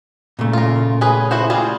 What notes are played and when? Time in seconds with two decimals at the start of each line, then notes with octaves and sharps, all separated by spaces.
0.39 A#2 C#3 A3
0.53 F4 A#4
1.01 C#4 G#4 B4
1.31 E4 F#4 C5
1.50 G3 F4 G#4